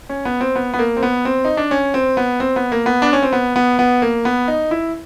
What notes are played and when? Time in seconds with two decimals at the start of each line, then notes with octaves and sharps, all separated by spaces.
0.09 C#4
0.25 B3
0.41 C4
0.56 B3
0.74 B3
0.79 A#3
0.97 C4
1.03 B3
1.25 C4
1.45 D#4
1.57 D4
1.71 C#4
1.94 C4
2.17 B3
2.40 C4
2.56 B3
2.72 A#3
2.86 B3
3.02 D4
3.13 C#4
3.23 C4
3.33 B3
3.56 B3
3.79 B3
4.02 A#3
4.25 B3
4.48 D#4
4.71 E4